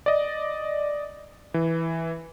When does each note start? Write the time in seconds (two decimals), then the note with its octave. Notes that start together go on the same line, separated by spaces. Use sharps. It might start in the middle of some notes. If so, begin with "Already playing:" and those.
0.06 D5 D#5
1.54 E3